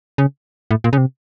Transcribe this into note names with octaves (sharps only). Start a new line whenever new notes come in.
C#3
A2
A#2
C#3
C3